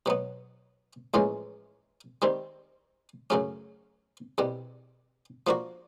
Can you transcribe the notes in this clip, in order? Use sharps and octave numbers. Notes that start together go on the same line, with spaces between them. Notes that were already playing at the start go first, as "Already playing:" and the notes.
B2 F#3 B3
A#1 A2 E3 G#3 C#4
D#3 G3 C4
F#2 C#3 F#3 A3 C#4
C2 B2 G3
F3 A#3 D4 F#4